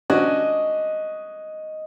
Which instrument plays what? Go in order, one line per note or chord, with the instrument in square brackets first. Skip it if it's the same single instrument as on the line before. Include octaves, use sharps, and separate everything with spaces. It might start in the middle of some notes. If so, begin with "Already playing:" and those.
[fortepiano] C#4 D4 F#4 [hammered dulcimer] D#5